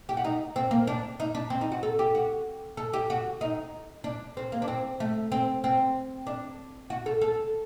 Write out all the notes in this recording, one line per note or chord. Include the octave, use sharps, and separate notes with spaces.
G4
F#4
D#4
C4
A#3
D4
D#4
D4
C4
D#4
F#4
A4
G4
F#4
A4
G4
F#4
D#4
D4
C4
A#3
D4
C4
A3
C4
C4
D4
F#4
A4
A4